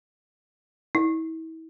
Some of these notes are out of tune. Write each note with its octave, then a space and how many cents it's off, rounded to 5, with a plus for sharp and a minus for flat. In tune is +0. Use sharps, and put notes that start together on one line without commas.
E4 -35